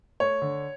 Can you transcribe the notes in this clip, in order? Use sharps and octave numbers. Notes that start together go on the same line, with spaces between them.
A3 C#5
D3